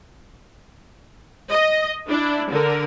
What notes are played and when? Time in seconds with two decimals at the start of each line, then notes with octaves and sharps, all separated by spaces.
1.49 D#5
2.07 D4 E4
2.50 D3 A#4